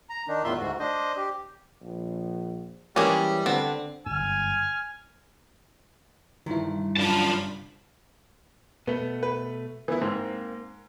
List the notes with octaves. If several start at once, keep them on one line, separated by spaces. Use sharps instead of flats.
A#5
D#3 D4 D#4
E2 A2 D#3 F4 E5 C6
D2 G#2 F#4
D4 C5 D#5
G4
A#1
E3 G3 G#3 A#3 C#4 D4 G#4
D3 B3 C4
G1 F#2 G#5 F6
G1 G2 C3 D#3 E4
F#2 D4 F4 A5 B5
B2 A3 B3
B4
E3 B3 E4
G#2 A#3 C4